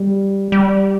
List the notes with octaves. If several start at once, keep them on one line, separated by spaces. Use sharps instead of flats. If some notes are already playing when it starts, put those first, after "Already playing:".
Already playing: G3
G3